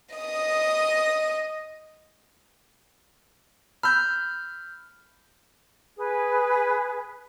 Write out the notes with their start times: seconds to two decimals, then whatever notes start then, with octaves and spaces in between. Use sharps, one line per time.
0.15 D#5 D#6
3.83 B5 E6 F6 G6
5.97 G#4 B4